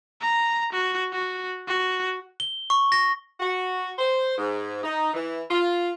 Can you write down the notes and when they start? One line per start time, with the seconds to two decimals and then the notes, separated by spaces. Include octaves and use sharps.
0.21 A#5
0.73 F#4
1.13 F#4
1.68 F#4
2.40 G7
2.70 C#6
2.92 A#6
3.40 F#4
3.98 C5
4.38 G#2
4.84 D#4
5.14 E3
5.50 F4